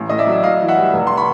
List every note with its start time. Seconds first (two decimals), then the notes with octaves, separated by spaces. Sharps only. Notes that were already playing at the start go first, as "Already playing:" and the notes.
Already playing: A1
0.09 A2 D#5
0.18 D5 E5
0.27 F#3
0.43 A2 D#5 F5
0.60 E3
0.68 E5 F#5
0.77 G3
0.93 F1
1.07 C6
1.17 B5 C#6